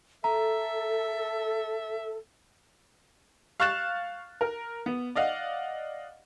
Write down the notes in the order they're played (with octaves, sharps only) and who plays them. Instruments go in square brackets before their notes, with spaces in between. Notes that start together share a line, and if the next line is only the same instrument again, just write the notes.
[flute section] A4 [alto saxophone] E5 [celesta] A#5
[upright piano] F5 C#6 F6 F#6 A6 E7
A#4
B3
D5 D#5 F5 F#5